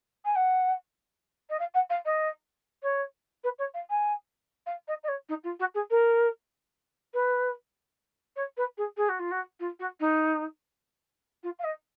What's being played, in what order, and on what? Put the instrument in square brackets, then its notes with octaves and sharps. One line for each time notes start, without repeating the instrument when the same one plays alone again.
[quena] G#5
F#5
D#5
F5
F#5
F5
D#5
C#5
B4
C#5
F5
G#5
F5
D#5
D#5
C#5
D#4
F4
F#4
G#4
A#4
B4
C#5
B4
G#4
G#4
F#4
F4
F#4
F4
F#4
D#4
F4
F5
D#5